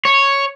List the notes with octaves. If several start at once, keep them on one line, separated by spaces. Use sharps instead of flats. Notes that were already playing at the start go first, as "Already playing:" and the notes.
C#5